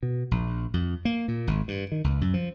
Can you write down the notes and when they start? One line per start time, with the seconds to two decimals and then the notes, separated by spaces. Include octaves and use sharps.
0.03 B2
0.31 A#1
0.74 F2
1.05 A#3
1.28 A#2
1.47 G#1
1.68 G2
1.92 D#3
2.04 C#2
2.21 F#2
2.34 F3